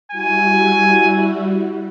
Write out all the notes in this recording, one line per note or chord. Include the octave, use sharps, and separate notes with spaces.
G3 E4 F#4 G#5